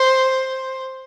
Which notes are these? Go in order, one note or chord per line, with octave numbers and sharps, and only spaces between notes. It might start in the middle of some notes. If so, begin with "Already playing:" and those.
Already playing: C5